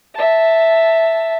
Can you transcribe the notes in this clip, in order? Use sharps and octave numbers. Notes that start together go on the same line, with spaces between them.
E5 A5